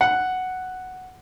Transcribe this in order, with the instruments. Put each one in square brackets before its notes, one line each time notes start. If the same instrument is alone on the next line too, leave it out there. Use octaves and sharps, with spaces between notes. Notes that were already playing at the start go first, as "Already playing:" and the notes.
[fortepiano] F#5